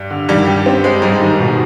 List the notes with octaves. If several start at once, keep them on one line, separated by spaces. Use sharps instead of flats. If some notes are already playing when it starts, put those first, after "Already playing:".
Already playing: G2
D3
G2 D#3 G3
G4
C4
G#3 C4
G#2 G3 G#3
D#3
B2